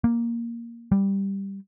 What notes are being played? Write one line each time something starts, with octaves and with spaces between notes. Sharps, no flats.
A#3
G3